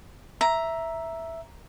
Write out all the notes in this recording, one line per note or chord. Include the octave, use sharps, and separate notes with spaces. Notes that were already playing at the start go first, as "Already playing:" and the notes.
E5 A#5